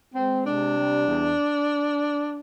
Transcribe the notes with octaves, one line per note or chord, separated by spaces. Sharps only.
G#3 C4
C3 D4
G3
E2